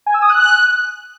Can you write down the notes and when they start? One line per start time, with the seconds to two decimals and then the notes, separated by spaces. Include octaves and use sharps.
0.06 G#5
0.14 E6
0.22 D#6
0.30 F#6